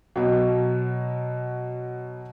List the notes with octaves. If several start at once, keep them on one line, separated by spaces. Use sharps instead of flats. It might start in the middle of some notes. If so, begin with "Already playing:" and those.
B2 F#3